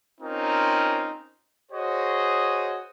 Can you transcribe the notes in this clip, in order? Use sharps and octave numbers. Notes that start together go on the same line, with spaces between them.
C4 C#4 D#4 F4 A#4
F#4 G#4 C5 C#5 D#5